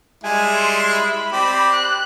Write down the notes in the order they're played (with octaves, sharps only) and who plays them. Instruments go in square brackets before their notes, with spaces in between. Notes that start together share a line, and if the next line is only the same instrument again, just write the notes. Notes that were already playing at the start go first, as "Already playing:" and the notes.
[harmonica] G3 G#3 E4 [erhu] G#5
[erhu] C6
B5
[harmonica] C4 G4 D5
[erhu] F#6